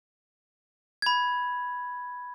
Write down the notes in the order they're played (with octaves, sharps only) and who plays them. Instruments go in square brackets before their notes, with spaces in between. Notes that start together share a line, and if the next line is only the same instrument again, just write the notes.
[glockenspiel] B5 G#6